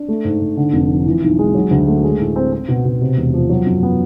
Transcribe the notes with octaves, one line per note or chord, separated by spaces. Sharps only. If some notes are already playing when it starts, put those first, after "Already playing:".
Already playing: D4
A3
G#2
G#2
D3
F1
F3
E3
B1
G#3
F#3
D2
A3
G#3
A2
C4
C4
B2
B2
C3
E1
F3
F#3
F#2
B3